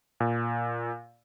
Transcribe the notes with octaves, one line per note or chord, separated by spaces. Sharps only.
A#2